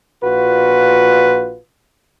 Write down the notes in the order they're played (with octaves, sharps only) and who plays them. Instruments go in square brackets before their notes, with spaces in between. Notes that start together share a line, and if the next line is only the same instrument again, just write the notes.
[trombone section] A#1 A#2 F4 F#4 B4